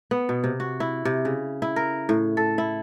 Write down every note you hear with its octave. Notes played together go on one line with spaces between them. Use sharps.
B3
B2
C3
F#4
E4
C3
C#3
E4
A#4
A2
A4
E4